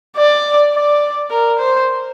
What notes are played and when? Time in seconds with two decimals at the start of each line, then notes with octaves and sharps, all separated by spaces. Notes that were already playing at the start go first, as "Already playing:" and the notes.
0.17 D5
0.74 D5
1.31 A#4
1.59 C5